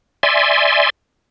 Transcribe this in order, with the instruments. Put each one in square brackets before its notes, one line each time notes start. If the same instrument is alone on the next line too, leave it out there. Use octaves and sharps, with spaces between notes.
[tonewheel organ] D5 E5 G#5 C6